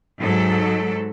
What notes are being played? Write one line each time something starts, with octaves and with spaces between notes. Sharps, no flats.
G#2 F#3 A4